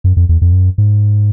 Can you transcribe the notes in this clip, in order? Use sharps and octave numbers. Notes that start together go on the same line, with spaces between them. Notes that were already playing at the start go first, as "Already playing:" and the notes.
F#2
F2
E2
F2
F#2
G#2